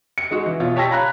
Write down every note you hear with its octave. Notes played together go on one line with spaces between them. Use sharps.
C#7
G#3 D#4 F#4 G#4
E3
B2 F4 C#5
G4 C#5 A5 E6 A#6 B6
F5 A#5 B5 F#6